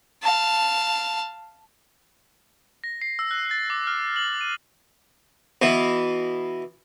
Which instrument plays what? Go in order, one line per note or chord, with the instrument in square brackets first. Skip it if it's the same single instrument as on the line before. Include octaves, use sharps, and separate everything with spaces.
[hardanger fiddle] F5 A5
[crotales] A#6
C7
E6
F#6
A6
D6
F6
F#7
D#7
[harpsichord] B2 E3